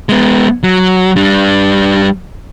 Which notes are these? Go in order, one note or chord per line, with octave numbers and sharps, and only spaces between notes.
G#3 B3
F#3
G3 D4